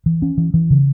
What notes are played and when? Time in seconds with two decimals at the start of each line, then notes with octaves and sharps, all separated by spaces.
0.06 E3
0.22 C#4
0.38 E3
0.54 E3
0.70 C#3